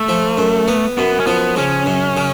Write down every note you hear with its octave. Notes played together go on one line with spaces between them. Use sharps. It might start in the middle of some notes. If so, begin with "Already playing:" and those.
Already playing: A3
F3
F#2
B3
F#2 B3
C#4
F3 B3
C#3 C#4
F#2
C#3